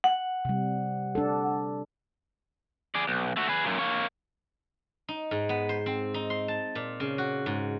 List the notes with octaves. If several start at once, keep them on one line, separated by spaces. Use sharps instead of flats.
F#5
C3 G3
D4 A4
G#4 D5
B1
A3 F#4
G#4 B4
F#2 A#2
A#3 C#5
D#4
G#2
B3
C5
C4
D#4
C6
A5
A#2
C#3
F#4
G#2